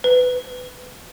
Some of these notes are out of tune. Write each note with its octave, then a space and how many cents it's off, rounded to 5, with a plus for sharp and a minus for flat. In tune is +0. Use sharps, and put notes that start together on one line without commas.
B4 +20